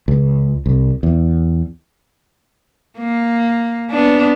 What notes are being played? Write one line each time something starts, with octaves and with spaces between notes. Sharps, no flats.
C#2
C2
E2
A#3
B3 D4